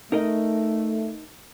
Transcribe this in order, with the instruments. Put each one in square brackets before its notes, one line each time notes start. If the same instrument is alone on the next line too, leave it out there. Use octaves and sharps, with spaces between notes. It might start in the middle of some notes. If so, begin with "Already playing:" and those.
[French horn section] A3 [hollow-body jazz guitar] D#4 A#4 D#5